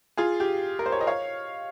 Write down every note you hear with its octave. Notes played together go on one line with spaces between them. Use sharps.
F4 G#4
G4
A#4
C5
C#5
D#5
C#5 F5